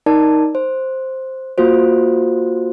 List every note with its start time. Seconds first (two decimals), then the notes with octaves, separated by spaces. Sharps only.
0.06 D#4 A#4 D5 A5
0.55 C5
1.58 A#3 F4 F#4 C5